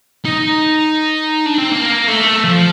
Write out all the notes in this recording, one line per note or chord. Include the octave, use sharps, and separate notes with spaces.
D#4
D4
C4
A#3
A3
F3